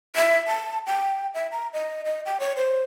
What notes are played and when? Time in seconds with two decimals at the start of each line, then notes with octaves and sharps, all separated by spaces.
0.16 E5
0.47 A5
0.87 G5
1.34 E5
1.52 A#5
1.73 D#5
2.05 D#5
2.26 G5
2.40 C#5
2.57 C5